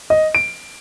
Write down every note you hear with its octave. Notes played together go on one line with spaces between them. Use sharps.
D#5
D7